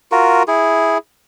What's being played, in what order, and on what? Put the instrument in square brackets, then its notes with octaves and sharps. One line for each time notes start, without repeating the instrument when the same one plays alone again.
[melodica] F4 F#4 A#4
E4 G#4